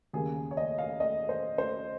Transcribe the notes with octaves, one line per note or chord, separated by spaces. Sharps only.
D#2 C#3 G3 A#3 G#4
C#5
D#5
F5
D#5
C5
C5